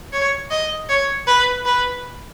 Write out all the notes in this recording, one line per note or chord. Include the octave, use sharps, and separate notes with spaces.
C#5
D#5
C#5
B4
B4